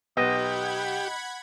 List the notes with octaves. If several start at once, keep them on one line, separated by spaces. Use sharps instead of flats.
B1 B3 G4 D#5 F#5 B5 G#6